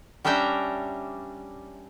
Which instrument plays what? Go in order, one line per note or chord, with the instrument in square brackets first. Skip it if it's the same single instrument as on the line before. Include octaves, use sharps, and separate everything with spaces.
[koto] G3 C#4 D4 E5 G5 A#5